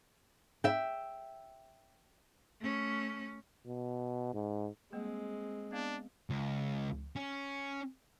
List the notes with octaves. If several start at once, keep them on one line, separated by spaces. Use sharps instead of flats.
E5 G5
A3 C#4
B2
G#2
G3 G#3 A#3 C4 G5
B3 D4 F5
C#2
C#4